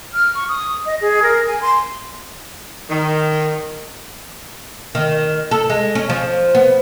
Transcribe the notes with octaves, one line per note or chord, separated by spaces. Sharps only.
F6
C#6
D#6
D#5
G#4
A#4
G#5
C6
D#3
D#3
A4
G#3
C#4
F3
B3